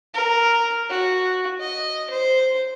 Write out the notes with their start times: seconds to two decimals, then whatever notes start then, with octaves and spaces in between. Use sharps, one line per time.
0.14 A#4
0.90 F#4
1.61 D#5
2.10 C5